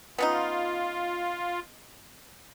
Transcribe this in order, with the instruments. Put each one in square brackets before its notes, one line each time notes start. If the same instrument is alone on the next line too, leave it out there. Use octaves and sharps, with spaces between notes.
[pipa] B3 C#4 D#4 [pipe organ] F4